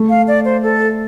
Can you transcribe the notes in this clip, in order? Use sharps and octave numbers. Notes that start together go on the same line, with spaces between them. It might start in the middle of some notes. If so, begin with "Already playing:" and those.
Already playing: A3
F5
D5
C5
A4